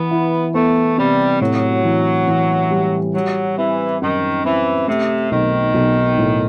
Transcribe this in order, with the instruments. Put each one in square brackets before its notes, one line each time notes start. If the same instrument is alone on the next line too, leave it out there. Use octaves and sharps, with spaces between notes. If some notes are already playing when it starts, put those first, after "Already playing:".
Already playing: [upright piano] E3 [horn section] B3
[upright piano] E4
[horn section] A3 [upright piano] B3
[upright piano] C3 [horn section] G3
[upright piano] A2 [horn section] F#3
[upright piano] E3
E3
G3
[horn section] F#3 [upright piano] G3
[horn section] E3 [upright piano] C4
[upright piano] F#2 [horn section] D#3
[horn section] E3 [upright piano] C4
[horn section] C3 [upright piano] A3
[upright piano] B1 [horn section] D#3
[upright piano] B1
A2